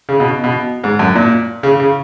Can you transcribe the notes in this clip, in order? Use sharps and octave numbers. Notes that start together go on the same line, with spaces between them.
C#3
B2
B2
G#2
F#2
A#2
C#3
C#3